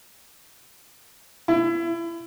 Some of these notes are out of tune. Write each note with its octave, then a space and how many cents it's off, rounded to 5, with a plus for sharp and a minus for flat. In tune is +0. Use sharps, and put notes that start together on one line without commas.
E4 +30